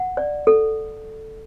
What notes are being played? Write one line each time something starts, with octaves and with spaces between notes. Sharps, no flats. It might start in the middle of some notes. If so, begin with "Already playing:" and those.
Already playing: F#5
D5
A4